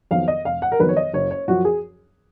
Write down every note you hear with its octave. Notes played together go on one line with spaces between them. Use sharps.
F2 D#3 F#3 B3 F5
D#5
F1 F5
F#5
A#4
F2 D#3 F#3 B3 B4
C#5
D#5
F#1 C#5
C#5
F#2 F3 F#4
G#4